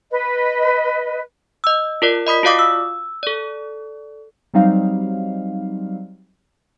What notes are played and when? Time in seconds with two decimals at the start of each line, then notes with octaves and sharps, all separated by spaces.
0.11 B4 D#5
1.64 D#5 E6
2.02 F4 A#4 D5
2.27 D#5 B5 D#6 B6
2.43 F4 F#4 D5 F5 D6 D#6
2.59 E6
3.23 A4 D5
4.54 F#3 G3 C4 D#4 F5